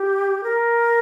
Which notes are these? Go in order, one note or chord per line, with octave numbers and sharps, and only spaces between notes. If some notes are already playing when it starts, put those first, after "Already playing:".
Already playing: G4
A#4